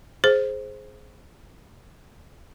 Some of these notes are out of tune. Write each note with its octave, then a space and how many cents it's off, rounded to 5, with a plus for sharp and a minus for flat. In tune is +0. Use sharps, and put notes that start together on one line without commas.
G#4 +15 C5 +10